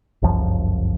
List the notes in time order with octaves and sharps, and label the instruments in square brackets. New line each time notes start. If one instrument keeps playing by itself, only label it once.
[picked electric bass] G1 C#2 F#2 F3